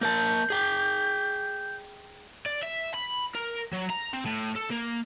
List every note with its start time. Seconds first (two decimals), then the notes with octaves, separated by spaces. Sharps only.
0.01 A#3 A#4 A5 G6
0.50 G#4 G5
2.46 D5
2.63 E5
2.94 B5
3.35 A#4
3.73 F#3
3.90 A#5
4.13 C4
4.26 A2
4.55 A4
4.70 A#3